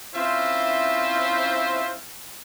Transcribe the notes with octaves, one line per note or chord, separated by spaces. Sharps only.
C4 C#4 E4 F4 C5 E5